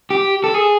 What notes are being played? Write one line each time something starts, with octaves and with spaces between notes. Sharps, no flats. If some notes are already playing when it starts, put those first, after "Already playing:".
G4
A4
G#4